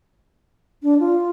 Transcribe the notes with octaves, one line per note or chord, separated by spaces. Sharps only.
D4
F4